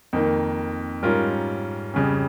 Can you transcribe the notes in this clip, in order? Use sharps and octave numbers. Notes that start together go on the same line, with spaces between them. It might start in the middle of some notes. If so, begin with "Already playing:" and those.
F2 D#3 A#3
G#2 G3 C#4 F4 A#4
F2 C#3 G3 C#4 G#4